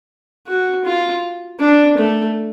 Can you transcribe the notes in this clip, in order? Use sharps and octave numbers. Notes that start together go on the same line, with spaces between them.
F#4
F4
D4
A3